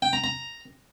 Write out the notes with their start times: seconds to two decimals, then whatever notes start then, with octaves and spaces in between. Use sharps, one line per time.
0.02 G5
0.13 A#5
0.24 A#5